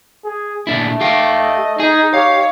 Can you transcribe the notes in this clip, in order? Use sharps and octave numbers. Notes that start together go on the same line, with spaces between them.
G#4
A#2 A3 D4 E4
G4 F5 G5
D#5
D#4 G#4 G#5
G4 C#5 F5